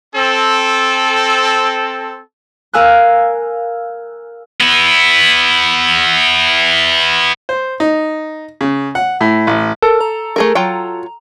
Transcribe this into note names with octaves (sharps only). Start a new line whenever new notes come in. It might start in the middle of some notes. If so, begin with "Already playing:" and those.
C4 A4
A#4 F5 G#5 E6 F#6
B3 E4
C5
D#4
C#3
F#5
A2
A1
A4 A#4
A#5
A3 G#4 A#4
F#3 F4 G5